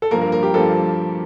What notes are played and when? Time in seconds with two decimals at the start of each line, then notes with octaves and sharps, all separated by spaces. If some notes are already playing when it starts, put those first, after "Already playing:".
0.02 A4
0.11 G2 F3 A#3 A#4
0.21 A#4
0.32 A#4
0.43 G4
0.54 G2 F3 A#3 A4